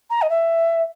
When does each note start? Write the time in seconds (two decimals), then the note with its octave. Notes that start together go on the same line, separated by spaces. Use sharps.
0.10 A#5
0.22 D#5
0.30 E5